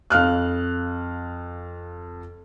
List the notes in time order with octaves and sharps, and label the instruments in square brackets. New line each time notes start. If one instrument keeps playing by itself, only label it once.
[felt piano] F2 F5 F6 F#6